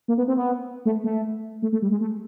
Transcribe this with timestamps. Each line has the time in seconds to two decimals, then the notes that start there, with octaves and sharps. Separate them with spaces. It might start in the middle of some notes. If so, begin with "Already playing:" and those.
0.08 A#3
0.18 B3
0.28 C4
0.37 B3
0.85 A3
1.04 A3
1.62 A3
1.73 A3
1.82 G3
1.91 G#3
2.01 A3